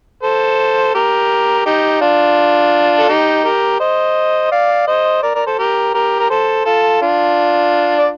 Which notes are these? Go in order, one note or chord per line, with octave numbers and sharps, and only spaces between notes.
A4 C5
G4 A#4
D#4 G4
D4 F4
A4
D#4 G4
G4 A#4
C5 D#5
D5 F5
C5 D#5
A#4 D5
A#4 D5
A4 C5
G4 A#4
G4 A#4
A#4
A4 C5
F4 A4
D4 F4
D5